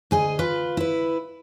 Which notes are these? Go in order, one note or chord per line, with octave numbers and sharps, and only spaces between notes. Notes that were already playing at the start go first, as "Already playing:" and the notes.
D2 G#4 D#5
F4 B4
E4 B4